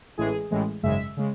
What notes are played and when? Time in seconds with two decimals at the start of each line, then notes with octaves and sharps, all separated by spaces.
0.18 A1 A2 E3 G#3 G#4
0.51 A1 A2 E3 G#3
0.83 G#1 F#2 C#3 G#3 E5
1.17 C#3 G#3